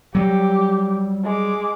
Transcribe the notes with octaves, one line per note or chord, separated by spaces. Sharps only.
F#3 G3 G4
G#3 D6